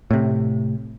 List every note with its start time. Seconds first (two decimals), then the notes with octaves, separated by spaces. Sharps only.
0.11 A2 C3